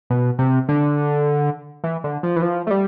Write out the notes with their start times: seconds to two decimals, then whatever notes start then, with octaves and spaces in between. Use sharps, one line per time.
0.10 B2
0.39 C3
0.69 D3
1.84 E3
2.04 D3
2.23 F3
2.36 E3
2.42 F3
2.67 A3
2.70 G3